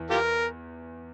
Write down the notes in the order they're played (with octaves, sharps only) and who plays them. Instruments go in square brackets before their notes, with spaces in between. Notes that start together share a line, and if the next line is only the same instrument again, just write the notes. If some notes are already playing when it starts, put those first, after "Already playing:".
Already playing: [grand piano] E2 E3
[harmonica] F4 G4 A#4